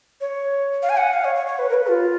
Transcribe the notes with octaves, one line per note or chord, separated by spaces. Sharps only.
C#5
F5
G#5
F#5
F5
C#5
C#5
C#5
B4
A#4
B4
F4